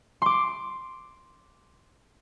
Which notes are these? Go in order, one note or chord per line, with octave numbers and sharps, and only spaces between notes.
C6 D6